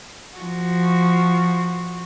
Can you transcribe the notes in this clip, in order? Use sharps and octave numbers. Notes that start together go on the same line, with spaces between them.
F3 F#4